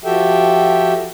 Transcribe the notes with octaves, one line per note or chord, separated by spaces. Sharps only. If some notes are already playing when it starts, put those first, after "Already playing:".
F3 F#4 G4 A4 E5 G5